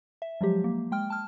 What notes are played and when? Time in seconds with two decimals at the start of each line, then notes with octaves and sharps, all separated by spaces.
0.22 E5
0.41 F3 F#3 G#3 G4
0.64 A#3
0.91 G#3 G5 F6
1.10 A5 F6